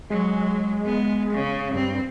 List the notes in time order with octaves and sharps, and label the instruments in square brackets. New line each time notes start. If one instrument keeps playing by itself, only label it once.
[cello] F#3 [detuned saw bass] G#3
[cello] B3
C#3
[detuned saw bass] G2 [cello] C4